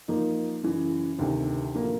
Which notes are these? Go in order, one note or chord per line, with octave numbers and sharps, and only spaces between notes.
F3 A#3 D#4
F#2 C#3 E3
D2 C3 D#3
A2 F3 A#3 D4